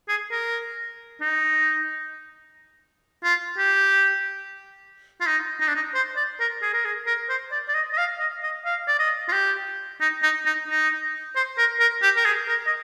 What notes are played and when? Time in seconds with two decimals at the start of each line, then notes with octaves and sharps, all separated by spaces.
0.09 G#4
0.31 A#4
1.21 D#4
3.24 F4
3.58 G4
5.21 F4
5.26 D#4
5.60 D#4
5.68 D4
5.75 D#4
5.95 C5
6.16 D5
6.40 A#4
6.62 G#4
6.73 A#4
6.85 G#4
7.06 A#4
7.29 C5
7.51 D5
7.68 D5
7.74 D#5
7.93 D#5
7.98 F5
8.19 D#5
8.43 D#5
8.65 F5
8.87 D5
8.99 D#5
9.28 F4
9.32 G4
10.01 D#4
10.23 D#4
10.46 D#4
10.68 D#4
11.35 C5
11.58 A#4
11.80 A#4
12.02 G4
12.16 A#4
12.25 G#4
12.48 A#4
12.67 D#5